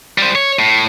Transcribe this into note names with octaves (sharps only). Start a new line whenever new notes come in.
G3 C5
C#5
A2